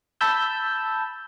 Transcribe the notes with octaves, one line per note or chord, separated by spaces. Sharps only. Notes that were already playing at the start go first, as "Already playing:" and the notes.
A5 B5 E6 G6